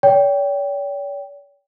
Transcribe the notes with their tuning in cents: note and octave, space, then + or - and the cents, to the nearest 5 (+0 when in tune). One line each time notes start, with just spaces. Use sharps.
C#5 +45 G5 +0